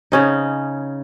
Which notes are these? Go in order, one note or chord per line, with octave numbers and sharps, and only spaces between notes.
C#3 C#4 D#4